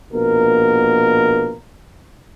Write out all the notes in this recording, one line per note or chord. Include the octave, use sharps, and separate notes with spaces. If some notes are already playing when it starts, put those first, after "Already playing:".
A#1 B2 A#3 A#4